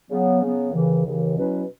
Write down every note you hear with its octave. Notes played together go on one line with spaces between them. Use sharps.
C#3 F#3 B3
C#3 F#3 B3
D#2 C#3 E3
D#2 C#3 E3
B2 F#3 C#4 E4 B4